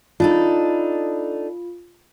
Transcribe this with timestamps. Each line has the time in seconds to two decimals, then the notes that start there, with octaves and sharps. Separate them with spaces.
0.20 D4 D#4 F4 A4